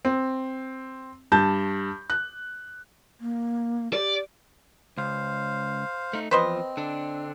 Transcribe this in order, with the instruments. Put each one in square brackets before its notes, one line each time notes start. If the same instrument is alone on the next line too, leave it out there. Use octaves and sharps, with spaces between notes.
[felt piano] C4
G2 A5 G6
F#6
[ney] A#3
[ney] G4 [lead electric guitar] D5
[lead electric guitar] C#2 [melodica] C5 F5
[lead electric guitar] A3 D#4
[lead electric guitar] E2 F3 [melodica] C4 [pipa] B4 C5 D#5
[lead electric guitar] D3 D4